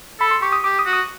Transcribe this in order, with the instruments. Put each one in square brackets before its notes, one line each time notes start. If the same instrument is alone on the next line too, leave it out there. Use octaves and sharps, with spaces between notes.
[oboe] A4 [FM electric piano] B5
[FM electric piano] C6
[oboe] G4 [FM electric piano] C#6
[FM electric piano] D#6
[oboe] G4 [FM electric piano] D6
[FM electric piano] D#6
[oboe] F#4
[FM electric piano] D#6